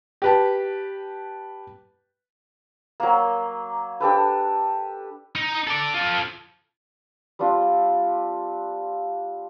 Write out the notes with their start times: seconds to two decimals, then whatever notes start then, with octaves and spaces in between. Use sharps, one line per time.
0.22 G4 B4 A5
3.00 F#3 A#3
4.00 D4 G4 A4 B4
5.35 D#4
5.67 A4 D5
5.94 F4 A4
7.39 G3 C4 D4 F4